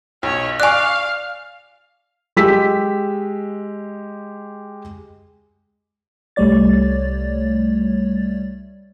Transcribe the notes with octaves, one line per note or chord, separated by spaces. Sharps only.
B1 C#5
D5 F5 G#5 C#6 F#6
G#3 G4 E6 B6
C2 G3 A3 C#5 D5 A6